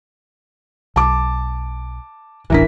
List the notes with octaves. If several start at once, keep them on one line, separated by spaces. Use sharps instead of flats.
B1 A5 D6
D#1 A1 E3 D4 A#4 B6